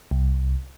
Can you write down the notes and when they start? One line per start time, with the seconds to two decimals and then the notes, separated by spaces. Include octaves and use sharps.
0.11 C2